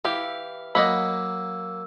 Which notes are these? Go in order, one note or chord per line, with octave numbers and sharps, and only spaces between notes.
E3 E4 G4 F5
F#3 A#3 D#5 F#5 B5 E6